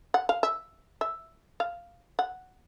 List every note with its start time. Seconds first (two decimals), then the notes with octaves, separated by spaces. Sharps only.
0.14 F#5
0.29 F5
0.43 E5
1.01 E5
1.60 F5
2.19 F#5